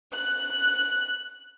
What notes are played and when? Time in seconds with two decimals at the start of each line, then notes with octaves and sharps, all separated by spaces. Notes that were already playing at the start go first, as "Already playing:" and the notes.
0.14 F#6